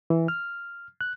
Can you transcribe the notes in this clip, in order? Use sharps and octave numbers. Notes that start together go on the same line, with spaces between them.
E3
F6
F#6